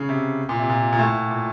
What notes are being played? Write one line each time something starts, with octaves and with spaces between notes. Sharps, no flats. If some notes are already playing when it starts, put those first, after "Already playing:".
Already playing: C#3
C3
A#2
C3
A#2
A#2
A2
A#2